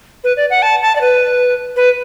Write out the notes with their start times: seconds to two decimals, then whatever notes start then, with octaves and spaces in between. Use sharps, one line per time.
0.24 B4
0.37 D5
0.50 F#5
0.62 A5
0.82 A5
0.96 D5
1.01 B4
1.76 B4